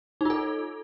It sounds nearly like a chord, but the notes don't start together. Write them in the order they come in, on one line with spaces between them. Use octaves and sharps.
D#4 F4 A4